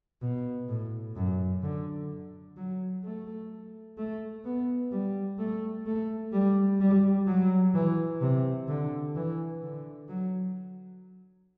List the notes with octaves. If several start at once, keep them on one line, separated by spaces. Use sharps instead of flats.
B2
A2
F#2
D3
F#3
A3
A3
B3
G3
A3
A3
G3
G3
F#3
E3
C3
D3
E3
D3
F#3